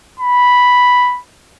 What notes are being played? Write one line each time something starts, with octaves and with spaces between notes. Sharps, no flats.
B5